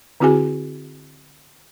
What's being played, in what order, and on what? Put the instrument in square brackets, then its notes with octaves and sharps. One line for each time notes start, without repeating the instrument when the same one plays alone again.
[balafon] D3 C4 E4 F#4 G#4 G#5